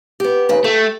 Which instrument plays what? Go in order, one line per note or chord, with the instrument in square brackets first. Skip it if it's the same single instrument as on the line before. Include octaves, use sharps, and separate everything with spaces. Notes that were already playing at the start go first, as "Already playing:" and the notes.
[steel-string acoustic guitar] B3 G4
D#2 C#3 B4
[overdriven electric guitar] A3 [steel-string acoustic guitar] G5